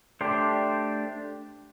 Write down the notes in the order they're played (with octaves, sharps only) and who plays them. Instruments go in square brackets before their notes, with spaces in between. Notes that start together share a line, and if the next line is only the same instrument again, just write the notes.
[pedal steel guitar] A3 D4 G4 C5